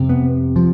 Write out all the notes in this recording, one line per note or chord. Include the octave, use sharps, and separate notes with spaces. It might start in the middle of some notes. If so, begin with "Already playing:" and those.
Already playing: F2 C3
B3
F3